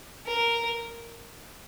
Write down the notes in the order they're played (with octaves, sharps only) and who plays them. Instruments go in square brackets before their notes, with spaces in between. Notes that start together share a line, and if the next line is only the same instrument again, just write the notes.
[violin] A#4